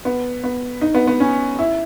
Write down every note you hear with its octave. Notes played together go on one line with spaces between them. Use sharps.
B3
B3
D#4
B3
B3
C#4
E4